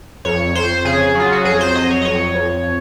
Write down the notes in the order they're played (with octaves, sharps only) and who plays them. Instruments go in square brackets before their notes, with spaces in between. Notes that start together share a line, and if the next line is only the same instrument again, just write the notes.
[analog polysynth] F2 C#5
F2 C5
C#3 G#4
F#3 F4
F#4
F2 G#4
C5
F#3 D#5
C#5
D#5
F2 C#5
F2